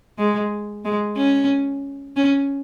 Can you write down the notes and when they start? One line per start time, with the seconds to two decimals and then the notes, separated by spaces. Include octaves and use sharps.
0.18 G#3
0.85 G#3
1.17 C#4
2.17 C#4